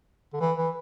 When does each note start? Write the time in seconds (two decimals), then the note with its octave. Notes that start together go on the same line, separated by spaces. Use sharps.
0.33 D3
0.40 E3
0.57 E3